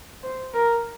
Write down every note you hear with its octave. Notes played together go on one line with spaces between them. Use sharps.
C5
A#4